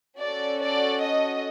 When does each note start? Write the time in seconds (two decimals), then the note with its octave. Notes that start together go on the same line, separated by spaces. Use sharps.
0.18 C#4 F#4 A4 D5
0.60 D5
1.02 D#5